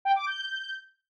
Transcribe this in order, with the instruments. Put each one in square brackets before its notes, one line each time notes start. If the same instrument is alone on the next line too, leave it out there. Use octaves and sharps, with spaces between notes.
[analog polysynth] G5
D6
G6